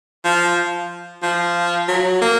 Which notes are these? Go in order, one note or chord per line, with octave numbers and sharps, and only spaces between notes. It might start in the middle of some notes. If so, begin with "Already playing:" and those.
F3
F3
F#3
A#3